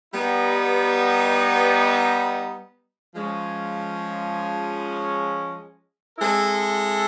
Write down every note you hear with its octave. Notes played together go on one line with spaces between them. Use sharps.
G3 B3 D#4
F3 G#3 C#4
G#3 C4 E4 A4